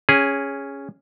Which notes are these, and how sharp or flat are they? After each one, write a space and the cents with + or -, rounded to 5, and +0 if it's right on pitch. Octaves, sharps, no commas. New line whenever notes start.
C#4 +0 G#4 -10